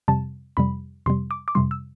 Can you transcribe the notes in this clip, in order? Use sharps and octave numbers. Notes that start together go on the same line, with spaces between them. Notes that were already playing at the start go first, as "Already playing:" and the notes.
F2 C3 G3 A5
F2 C3 G3 B5
F2 C3 G3 C6
D6
D6
F2 C3 G3 C6
E6